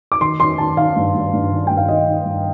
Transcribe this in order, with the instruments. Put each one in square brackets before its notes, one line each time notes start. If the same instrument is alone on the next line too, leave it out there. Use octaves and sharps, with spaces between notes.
[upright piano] D6
D#3 C6
D#3 C6
D#3 A5
D#3 F5
G2
G2
G2
D#3
G2 G5
F5
D#3 D#5
D#3
G2